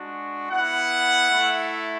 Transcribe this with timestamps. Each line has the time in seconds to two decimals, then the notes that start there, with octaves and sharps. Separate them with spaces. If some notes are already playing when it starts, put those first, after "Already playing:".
Already playing: G#3 D4 F#4
0.50 B3 E4 F#5
1.31 A3 E4